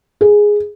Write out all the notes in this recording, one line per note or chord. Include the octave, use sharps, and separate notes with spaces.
G#4